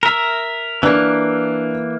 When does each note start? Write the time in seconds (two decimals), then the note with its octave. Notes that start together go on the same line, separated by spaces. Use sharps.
0.03 A#4 E5
0.83 E3 A#3 D4